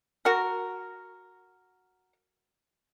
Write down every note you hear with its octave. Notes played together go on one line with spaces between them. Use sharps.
F#4 A#4